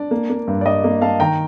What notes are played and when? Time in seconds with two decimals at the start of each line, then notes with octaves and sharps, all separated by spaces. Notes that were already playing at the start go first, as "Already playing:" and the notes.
Already playing: D4 D5
0.11 A#3
0.30 A#3
0.48 G2
0.61 D5
0.66 G2 D#5
0.84 A#3
1.02 A#3 F5 A5
1.20 D#3 G5 A#5